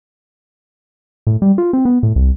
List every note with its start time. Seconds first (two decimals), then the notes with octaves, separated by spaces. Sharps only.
1.27 A2
1.42 G3
1.58 F4
1.73 C4
1.85 B3
2.03 A2
2.16 C2